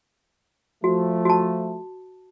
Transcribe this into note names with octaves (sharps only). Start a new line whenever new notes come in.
F3 A3 F#4
F#4 A5